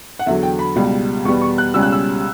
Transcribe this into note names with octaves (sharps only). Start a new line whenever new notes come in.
F#5
E2 D3 F#3 E5
G5
B5
C#2 B2 G3
E2 B2 G3 B3 C#6
C#6
F#6
C#2 B2 G3 C#4 E6
F#6
E6